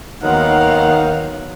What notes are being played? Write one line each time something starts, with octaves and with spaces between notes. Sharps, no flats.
D#2 D#3 F#3 B3 D#4 F5 F#5 C6